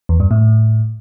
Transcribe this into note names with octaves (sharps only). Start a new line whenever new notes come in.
E2
G2
A2